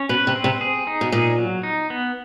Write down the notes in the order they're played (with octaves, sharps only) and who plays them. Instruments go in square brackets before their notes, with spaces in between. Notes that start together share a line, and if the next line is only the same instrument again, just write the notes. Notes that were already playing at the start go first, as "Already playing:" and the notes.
Already playing: [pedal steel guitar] C#4
[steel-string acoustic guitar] B2 [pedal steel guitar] B4
[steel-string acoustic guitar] C3
[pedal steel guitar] C4
[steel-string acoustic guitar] C3
[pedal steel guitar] G#4
D#4
[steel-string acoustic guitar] B2
[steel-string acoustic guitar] A#2 [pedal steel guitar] G#4
[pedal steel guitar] F#3
D#4
B3